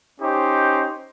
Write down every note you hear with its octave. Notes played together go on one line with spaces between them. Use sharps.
C#4 D#4 G4 C5